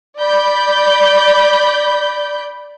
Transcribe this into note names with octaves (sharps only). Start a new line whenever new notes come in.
D5 B5 G6